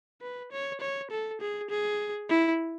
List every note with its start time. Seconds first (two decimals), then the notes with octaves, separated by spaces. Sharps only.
0.22 B4
0.52 C#5
0.81 C#5
1.11 A4
1.41 G#4
1.70 G#4
2.30 E4